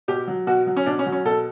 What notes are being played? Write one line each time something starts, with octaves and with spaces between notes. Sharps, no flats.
B2 G4
F#3
B2 F#4
F#3
C#4
B2 D4
C#4
F#3
C#4
B2 A4